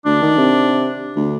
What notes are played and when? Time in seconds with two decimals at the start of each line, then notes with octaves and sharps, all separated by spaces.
0.05 D2 D4
0.22 D#3
0.38 C3
1.16 D2